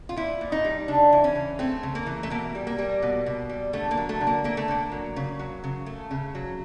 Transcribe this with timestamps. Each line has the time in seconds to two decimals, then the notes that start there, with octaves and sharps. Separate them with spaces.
0.09 F4
0.16 A#2 E4
0.41 A#2
0.52 D#4
0.65 G3
0.88 C#3 D4
1.13 E3
1.24 C#4
1.35 C#3
1.59 A3 C4
1.83 C#3
1.95 A#3
2.06 E3
2.23 A3
2.30 B2 A#3
2.55 G3
2.67 A#3
2.78 G3
3.02 B2
3.26 B2
3.49 G3
3.73 D3 A3
3.91 A#3
3.97 F#3
4.09 A3
4.21 D3
4.27 A#3
4.44 A3 A#3
4.57 A3
4.68 D3 A#3
4.92 F#3
5.16 C#3
5.39 F#3
5.64 C#3
5.86 A3
6.11 C#3
6.35 F#3